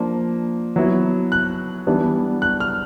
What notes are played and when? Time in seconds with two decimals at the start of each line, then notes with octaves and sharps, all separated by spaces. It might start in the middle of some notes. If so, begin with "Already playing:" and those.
Already playing: F3 A#3 D4
0.76 F#3 B3 E4
1.32 F#6
1.87 E3 G3 B3 D4
2.42 F#6
2.60 F6